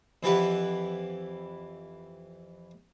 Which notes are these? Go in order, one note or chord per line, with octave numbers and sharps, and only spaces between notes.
F2 E3 E4 G4 B4 F#5